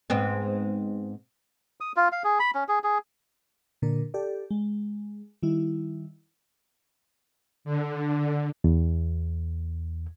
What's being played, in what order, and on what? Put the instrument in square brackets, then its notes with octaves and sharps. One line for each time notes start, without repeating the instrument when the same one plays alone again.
[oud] G#2 B3 C4
[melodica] D#6
F4
F5
G#4
B5
C#4
G#4
G#4
[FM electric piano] A#2 D3 D4 A#4
G4 A4 D5
G#3
D#3 G3 E4
[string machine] D3
[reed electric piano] E2